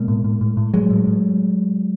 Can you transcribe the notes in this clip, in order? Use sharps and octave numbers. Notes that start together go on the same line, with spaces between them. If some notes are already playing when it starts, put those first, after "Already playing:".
Already playing: B2 G#3 A#3
A2
A2
A2
A2
A2 F#3 G#3
A2
A2